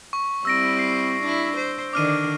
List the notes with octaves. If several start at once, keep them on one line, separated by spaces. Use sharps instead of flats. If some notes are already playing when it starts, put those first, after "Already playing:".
C#6
G3 C4 E4 E6 A#6 D7
C7
D4 E4
C5
D3 D#3 D4 D6 F6 D#7